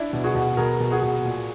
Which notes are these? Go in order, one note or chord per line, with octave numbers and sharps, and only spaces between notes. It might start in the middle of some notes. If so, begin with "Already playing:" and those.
Already playing: D4 E4
B2
F#4 G#4
B2
B2 G#4 A#4
B2
F#4 G#4
B2
A#2